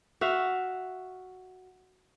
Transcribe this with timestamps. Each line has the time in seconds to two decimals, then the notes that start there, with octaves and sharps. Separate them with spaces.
0.21 F#4 E5 F5